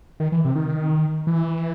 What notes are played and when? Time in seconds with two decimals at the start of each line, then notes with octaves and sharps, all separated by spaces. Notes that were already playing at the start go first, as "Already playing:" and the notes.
0.20 D#3
0.32 E3
0.45 C3
0.55 D#3
1.27 E3